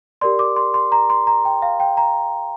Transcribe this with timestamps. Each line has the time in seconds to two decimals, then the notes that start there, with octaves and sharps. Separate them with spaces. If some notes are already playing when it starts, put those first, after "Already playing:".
0.21 G4 A#4 D5 C6
0.39 D6
0.56 C6
0.74 C6
0.92 A#5
1.10 C6
1.27 A#5
1.45 G5
1.62 F5
1.80 G5
1.97 A#5